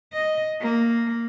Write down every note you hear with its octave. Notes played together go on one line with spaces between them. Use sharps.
D#5
A#3